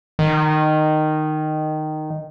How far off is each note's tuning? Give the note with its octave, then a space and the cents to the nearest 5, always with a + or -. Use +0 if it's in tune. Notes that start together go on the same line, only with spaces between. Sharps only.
D#3 -10